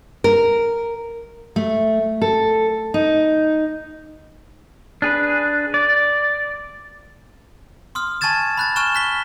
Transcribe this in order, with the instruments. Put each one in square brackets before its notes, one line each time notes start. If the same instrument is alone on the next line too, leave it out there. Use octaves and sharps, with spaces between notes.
[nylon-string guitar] A#4
[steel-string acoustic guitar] A3
A4
D#4
[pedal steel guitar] D4 G#4 B4
D5
[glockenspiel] C6 D#6 F6
G#5 A5 C#6 G#6 A6 E7
B5 F#6 A6
G#5 C#6 F6 F#6 E7 G7
F#6 B6 G7